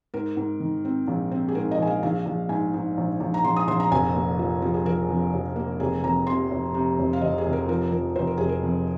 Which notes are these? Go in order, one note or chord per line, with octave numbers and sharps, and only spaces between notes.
G#2 A#4
G#2
D#3
C4
A#1
C4
G#4
G#2 A#4
D#5
A#1 G#5
F5
A#1 F5
A#1
G#2 G#5
G#2
A#1
A#1
A#5
A#1 C6
D#6
A#1 C6
A#5
F1 G#5
A#3
F3
F3
G#4
F3 A#4
F2
F1
A#3
F1 G#4
F2 A#5
C3 C6
F1
C3
F1
F5
F1 D#5
G#4
F1
A#4
F3 A#4
F3 A#4
F1 C5
A#4
F1 G#4
A#4
F2